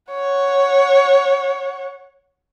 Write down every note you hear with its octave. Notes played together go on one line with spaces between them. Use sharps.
C#5 F#5